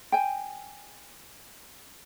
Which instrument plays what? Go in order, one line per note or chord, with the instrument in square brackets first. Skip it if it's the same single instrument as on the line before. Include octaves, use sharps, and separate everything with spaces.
[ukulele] G5 G#5